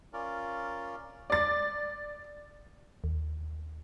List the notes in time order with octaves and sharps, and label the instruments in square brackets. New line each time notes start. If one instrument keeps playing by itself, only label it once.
[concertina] C#4 F4 A#4 D5
[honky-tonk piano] D5 A6
[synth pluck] D#2